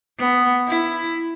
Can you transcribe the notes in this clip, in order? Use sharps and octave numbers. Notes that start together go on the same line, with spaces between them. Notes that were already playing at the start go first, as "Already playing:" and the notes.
B3
E4